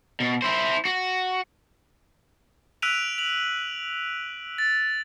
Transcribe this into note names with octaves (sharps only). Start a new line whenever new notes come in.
B2
E4 C5
F#4
E6 F#6 B6 D7 D#7 F7
F7 F#7
A6